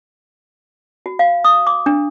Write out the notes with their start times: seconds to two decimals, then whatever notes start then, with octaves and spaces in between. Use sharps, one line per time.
1.06 F#4
1.19 F5
1.44 D#6
1.67 D6
1.86 D4